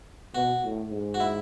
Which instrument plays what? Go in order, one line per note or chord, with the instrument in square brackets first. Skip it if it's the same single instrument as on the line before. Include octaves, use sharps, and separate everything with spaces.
[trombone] B2 [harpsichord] F#4
[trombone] A2
G#2
[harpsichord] F#4
E4